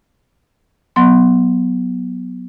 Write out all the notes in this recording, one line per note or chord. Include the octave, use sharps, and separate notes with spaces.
F#3 B3 C6